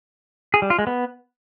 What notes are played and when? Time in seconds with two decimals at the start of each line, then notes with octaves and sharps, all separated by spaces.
0.54 G#4
0.62 G3
0.70 F4
0.79 G#3
0.87 B3